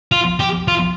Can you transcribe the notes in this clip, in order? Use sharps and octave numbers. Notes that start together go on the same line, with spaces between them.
F4
G4
F4